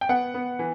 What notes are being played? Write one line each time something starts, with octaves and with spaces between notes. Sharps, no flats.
G5
B3 F#5
B3
E3